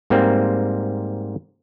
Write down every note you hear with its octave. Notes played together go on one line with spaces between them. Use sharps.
G#2 G3 A#3 C4